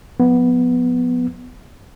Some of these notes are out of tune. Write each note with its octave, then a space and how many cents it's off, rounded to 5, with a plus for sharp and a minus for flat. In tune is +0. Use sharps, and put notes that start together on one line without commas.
F3 +40 B3 +0